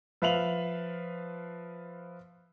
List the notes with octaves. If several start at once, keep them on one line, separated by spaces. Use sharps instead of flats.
F3 B4 E5 F5 F7 F#7